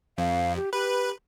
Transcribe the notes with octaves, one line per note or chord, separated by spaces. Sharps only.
F2 F5
G4
G4 B4